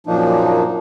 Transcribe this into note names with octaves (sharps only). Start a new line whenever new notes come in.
F#2 A#2 F3 A#3 D4 D#4